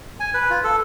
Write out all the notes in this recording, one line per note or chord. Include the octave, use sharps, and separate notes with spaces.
G#5
B4
F4
A4